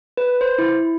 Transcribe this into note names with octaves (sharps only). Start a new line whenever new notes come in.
B4
C5
E4